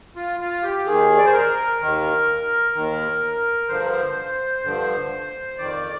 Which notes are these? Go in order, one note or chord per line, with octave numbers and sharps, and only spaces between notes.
F4
F4
G4
D#2 D#3 G#4
D5
C5
A#4
D#2 D#3
D#2 D#3
G2 D3 F3 C5
G2 D3 F3
F2 D#3 D5